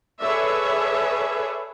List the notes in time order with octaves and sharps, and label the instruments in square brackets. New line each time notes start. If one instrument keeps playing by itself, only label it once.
[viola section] G#4 A4 B4 C#5 D5 E5